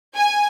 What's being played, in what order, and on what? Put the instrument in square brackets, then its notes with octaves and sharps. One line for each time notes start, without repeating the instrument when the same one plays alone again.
[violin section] G#5